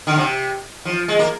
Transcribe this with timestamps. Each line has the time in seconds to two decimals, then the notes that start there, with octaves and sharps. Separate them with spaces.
0.07 D3
0.17 C3
0.85 F3
1.08 G#3
1.19 A#3